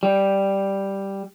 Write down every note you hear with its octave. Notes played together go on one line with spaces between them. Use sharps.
G3